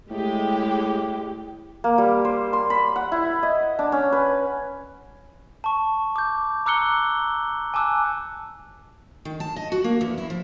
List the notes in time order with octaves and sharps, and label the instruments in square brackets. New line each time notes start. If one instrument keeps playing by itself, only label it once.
[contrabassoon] A2 [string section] G#3 G4
[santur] A#3
G3
C5
C6
B5
F#5
E4
D#5
D4
C#4
B4
[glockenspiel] A5 C#6
D6 G6
A#5 D6 E6 F#6 C#7 G7
G#5 A5 D6 E6 F#6
[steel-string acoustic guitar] D#3
A5
D#5
F#4
A#3
E2
E4
F3